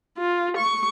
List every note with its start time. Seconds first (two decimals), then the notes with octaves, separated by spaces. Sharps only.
0.18 F4
0.57 C#6